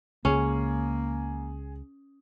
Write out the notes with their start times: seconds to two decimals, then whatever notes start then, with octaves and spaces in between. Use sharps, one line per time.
0.25 C#2 A#3 C#4 G#4